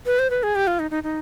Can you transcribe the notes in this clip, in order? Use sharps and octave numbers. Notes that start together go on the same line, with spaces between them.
B4
C5
B4
G#4
G4
F4
D#4
D#4
D#4